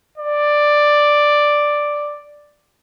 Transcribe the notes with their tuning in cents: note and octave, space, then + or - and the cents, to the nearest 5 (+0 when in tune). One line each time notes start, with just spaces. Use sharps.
D5 +5